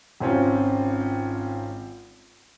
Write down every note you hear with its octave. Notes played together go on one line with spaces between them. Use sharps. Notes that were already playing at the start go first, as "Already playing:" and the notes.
G#1 C4 C#4 F4